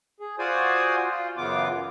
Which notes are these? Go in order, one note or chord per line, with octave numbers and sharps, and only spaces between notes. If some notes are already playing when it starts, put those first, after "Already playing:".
G#4
F4 F#4 C5 D5 G#5 D#6
F4
F#2 C#3 E3 B3 F4 D6